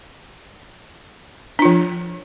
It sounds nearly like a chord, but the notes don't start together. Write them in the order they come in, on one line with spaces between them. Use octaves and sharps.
D4 F4 F3